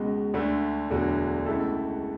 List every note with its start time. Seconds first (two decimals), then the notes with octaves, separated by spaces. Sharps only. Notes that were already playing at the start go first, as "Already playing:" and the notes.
Already playing: C#2 B2 G#3
0.34 D2 D3 A3
0.90 E1 D2 D3 F#3
1.46 C#2 B2 A3 E4 A4